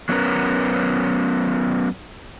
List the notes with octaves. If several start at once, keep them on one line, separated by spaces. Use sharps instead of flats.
F#3 B3 C#4 A#4 B4